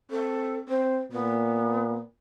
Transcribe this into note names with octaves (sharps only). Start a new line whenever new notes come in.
C4 A4
C4 C5
A#2 B3